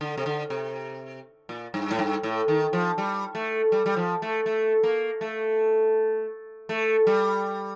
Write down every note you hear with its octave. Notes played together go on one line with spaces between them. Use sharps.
D3
C3
D3
C3
A#2
G2
A2
G2
A2
D#3
F3
G3
A3
G3
G3
F3
A3
A3
A#3
A3
A3
G3